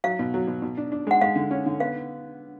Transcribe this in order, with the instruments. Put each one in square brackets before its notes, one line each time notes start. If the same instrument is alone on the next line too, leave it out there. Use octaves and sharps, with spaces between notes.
[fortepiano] F#3 [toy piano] F5
[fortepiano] B2
F#3
B2
B2
D4
D4
[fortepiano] G#3 [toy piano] F#5
[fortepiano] G#3 [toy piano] F5
[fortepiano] D3
C#4
D3
[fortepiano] B3 [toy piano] F5